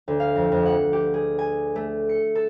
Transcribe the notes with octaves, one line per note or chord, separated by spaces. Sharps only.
D2
F5
F2
F2
F#5
G4
G#4
G#5
A3
C#7
A4